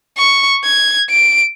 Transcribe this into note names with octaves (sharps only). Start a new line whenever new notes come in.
C#6
G#6
D7